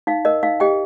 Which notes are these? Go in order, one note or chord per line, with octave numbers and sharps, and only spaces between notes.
D#4 F5
A#4 D#5
D#4 F5
G4 D#5 G5